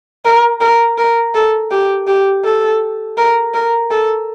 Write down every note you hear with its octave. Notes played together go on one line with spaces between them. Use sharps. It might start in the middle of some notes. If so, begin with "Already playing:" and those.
A#4
A#4
A#4
A4
G4
G4
A4
A#4
A#4
A4